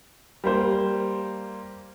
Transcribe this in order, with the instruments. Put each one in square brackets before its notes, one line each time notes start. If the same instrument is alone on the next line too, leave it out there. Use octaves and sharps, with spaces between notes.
[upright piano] G3 A#3 C5